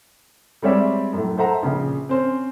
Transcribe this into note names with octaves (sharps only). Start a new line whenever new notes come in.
G3 G#3 C4 C#5 D5 E5
F#2 A2
A4 C5 E5 F#5 A#5
A#1 C#3
C4 C#4 C5